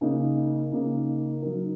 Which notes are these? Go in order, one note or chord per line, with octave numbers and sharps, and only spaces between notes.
C#3 A#3 D#4
C#3 A#3 D#4
F#3 D#4 A#4